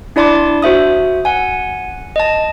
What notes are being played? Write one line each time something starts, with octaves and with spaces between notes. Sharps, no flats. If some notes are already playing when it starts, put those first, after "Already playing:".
D4 E4 D5 A5 C6 D6
F#4 C5 E5 D#6
F#5 G#5
D#5 A5